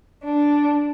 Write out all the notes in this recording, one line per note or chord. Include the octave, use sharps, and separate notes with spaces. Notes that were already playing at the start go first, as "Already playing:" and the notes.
D4